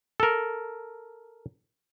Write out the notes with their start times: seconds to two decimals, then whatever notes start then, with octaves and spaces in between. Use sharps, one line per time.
0.20 A4 A#4